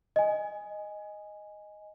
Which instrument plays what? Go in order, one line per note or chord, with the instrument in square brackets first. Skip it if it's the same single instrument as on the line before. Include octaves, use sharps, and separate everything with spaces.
[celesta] D#5 G#5